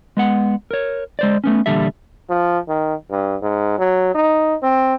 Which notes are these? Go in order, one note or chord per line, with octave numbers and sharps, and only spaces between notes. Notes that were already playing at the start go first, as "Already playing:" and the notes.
G#3 B3 F#5
A#4 C#5
G#3 C5 D5
A3 B3 C#4
E2 A#2 D3 G3 A4 E5
F3
D#3
G2
G#2
F#3
D#4
C4